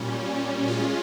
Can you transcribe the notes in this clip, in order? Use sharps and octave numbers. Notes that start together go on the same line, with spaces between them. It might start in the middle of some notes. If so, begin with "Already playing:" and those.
Already playing: A#2 G3 C#4
G#3 C#4 F4